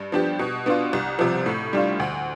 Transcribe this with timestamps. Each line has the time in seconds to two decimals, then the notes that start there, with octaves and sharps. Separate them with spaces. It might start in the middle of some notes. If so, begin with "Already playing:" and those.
Already playing: G2
0.12 F3 B3 D4 G4
0.39 B2
0.66 B3 D4 F4
0.93 C2
1.19 C3 F3
1.46 A2
1.73 G3 D4 F4
2.00 D2